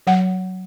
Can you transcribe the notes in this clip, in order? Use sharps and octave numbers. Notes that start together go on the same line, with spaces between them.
F#3 F#5